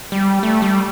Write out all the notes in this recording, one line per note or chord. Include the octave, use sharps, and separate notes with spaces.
G3
A3
G3